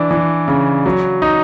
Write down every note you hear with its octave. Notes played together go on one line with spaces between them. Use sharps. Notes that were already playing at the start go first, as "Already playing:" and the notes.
Already playing: E3 D4
E3
C#3
F#3
D#4